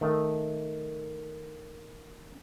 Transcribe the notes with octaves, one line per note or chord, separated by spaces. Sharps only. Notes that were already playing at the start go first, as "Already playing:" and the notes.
D#3 A3